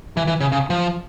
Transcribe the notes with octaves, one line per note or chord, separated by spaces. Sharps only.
E3
E3
C#3
C#3
F3